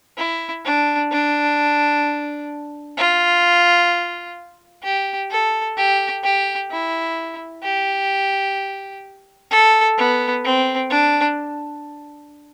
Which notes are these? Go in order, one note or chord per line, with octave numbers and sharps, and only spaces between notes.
E4
D4
D4
F4
G4
A4
G4
G4
E4
G4
A4
B3
C4
D4